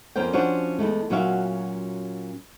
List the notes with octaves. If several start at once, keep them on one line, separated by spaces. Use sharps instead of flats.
F2 B3 C#4 A#4 C5 G5
F3 C#4 D4 F4 F#4 C5
E2 G2 G#3 A3
A#2 F#3 C#4 F#4 E5 F5